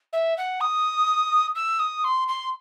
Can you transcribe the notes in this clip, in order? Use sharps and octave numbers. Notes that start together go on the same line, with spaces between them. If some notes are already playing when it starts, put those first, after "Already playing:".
E5
F#5
D#6
E6
D#6
C6
C6